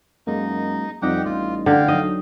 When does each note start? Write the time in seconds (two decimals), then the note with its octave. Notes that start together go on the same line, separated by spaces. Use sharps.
0.27 F#2 G#3 A#3 D#4
1.02 F2 G3 D#4 G4 D#5 F#5 G5
1.25 A1 F4
1.66 D3 F5 G5
1.88 F#3 D#4 D#5